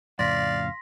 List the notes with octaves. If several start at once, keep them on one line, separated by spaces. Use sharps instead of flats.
F2 A2 C#3 D5 F5 C6 A#6 B6